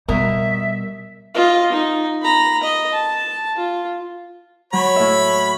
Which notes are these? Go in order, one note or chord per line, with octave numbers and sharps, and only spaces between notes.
B2 G3 A#4 E5 A#5
F4 D#5
D#4
A#5 B5
D#5
A5
F4
F#3 C#5 B5
A2 E5